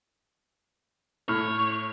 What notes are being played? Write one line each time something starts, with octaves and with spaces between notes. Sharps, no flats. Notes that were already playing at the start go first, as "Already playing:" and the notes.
A2 C#5 F6